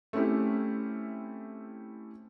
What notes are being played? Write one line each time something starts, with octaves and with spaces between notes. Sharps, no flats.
A3 C4 C#4 E4 G4